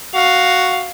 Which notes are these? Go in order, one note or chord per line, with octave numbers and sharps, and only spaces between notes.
F#4 F5